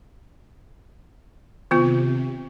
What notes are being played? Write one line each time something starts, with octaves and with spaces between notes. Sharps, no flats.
C3 D#3 B3 F4